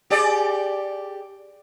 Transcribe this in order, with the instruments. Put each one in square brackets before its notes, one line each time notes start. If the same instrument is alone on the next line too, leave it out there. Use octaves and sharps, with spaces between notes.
[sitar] G4 G#4 D5